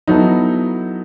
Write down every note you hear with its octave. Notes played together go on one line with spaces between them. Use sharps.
F#3 B3 D#4 E4 A4